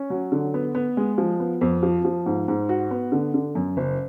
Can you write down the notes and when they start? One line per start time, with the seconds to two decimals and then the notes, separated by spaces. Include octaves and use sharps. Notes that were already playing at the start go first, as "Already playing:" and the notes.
Already playing: C#4
0.10 F#3
0.32 D3
0.54 B3
0.75 B3
0.97 G#3
1.18 F3
1.40 B3
1.61 F2
1.83 F3
2.05 F3
2.26 G#2
2.48 G#2
2.69 F#4
2.91 B3
3.12 D3
3.34 D3
3.55 F#2
3.77 F#1